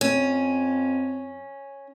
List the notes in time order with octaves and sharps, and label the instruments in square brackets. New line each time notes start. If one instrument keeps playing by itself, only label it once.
[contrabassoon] F2 [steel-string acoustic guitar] C#4